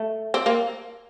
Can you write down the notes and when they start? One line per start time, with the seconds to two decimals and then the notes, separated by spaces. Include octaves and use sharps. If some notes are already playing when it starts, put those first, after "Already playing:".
Already playing: A3
0.34 C4
0.46 A#3